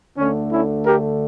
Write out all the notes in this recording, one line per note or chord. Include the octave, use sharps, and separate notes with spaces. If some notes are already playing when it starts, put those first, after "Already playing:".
D2 D3 A3 C#4
C#4 E4
G4 A#4